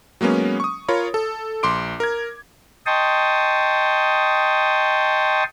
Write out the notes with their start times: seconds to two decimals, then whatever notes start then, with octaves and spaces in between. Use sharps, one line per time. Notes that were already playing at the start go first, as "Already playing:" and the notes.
0.21 F#3 G#3 A#3 B3 C#4
0.60 C#6 D#6
0.88 F4 A#4 C#5 B5
1.14 A4
1.63 A#1 C6 D6 D7
2.00 A#4 G#6
2.86 D#5 G5 A5 C6 C#6 D#6